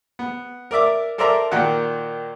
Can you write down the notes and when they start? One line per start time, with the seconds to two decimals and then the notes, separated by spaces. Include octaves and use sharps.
0.19 B3
0.71 A#4 D5 E5 D6
1.18 A4 A#4 C5 D5 E5 A#5
1.51 A#2 D#3 A#3 F#4 F#5 G5